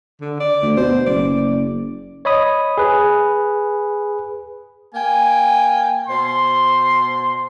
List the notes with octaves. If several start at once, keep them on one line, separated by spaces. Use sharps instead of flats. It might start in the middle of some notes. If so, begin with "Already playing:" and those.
D3
D5
D2
B2 C5
F#1 D5
C#5 D#5 B5 D#6
G#4 B4
A#3 G5 G#5
B2 C5 C6